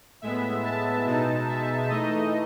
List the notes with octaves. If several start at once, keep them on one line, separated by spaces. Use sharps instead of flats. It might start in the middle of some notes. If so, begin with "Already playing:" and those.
A2 G#3 B3 E5
A5
B2 G#3 D#4
E5
E3 A3 D#4 D#5